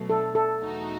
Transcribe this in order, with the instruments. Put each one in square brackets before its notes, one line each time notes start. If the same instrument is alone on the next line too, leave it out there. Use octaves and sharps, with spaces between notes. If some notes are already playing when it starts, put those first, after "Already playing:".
Already playing: [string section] B2 F#3 A3
[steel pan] A4
A4
[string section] E2 B2 A3 D#4 F#4